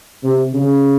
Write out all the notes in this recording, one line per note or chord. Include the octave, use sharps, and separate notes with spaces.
C3
C#3